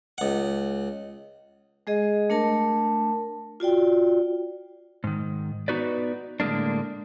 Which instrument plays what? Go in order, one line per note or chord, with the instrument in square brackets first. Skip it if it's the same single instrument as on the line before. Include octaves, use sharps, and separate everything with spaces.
[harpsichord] C#2 F#5
[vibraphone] G#3 G#4 D#5
A3 D4 A#4 A5
F4 F#4 D5 G5
[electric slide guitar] G#2 D#3
B3 D#4 F#4 B4 D5
A2 D3 G#3 A#3 D4